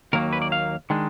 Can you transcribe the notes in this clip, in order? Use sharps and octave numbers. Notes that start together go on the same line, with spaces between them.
D#2 D#3 F#3 A#3 A#4
B4
D5
F5
D#3 G#3 D4